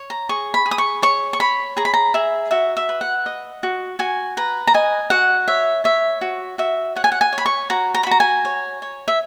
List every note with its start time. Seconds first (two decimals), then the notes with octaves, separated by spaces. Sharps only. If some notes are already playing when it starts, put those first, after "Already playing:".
Already playing: C#5
0.10 A#5
0.29 G#4 C#6
0.54 B5
0.66 G#4
0.71 D#6
0.78 C#6
1.02 C#5 C#6
1.33 C#6
1.40 C#5 B5
1.77 G#4 A#5
1.85 B5
1.94 A#5
2.14 G#4 E5
2.51 F#4 E5
2.77 E5
2.89 B4
3.01 F#5
3.26 D#5
3.63 F#4
3.99 F#4 G#5
4.37 B4 A#5
4.67 A#5
4.74 D#5 G#5
5.10 F#4 F#5
5.48 C#5 E5
5.84 C#5 E5
6.21 F#4
6.58 F#4 E5
6.95 C#5 F#5
7.04 G#5
7.12 F#5
7.21 G#5
7.33 C#5
7.38 B5
7.46 C#6
7.70 F#4 A#5
7.94 A#5
8.03 B5
8.07 F#4 A#5
8.20 G#5
8.45 C#5
8.82 C#5
9.08 E5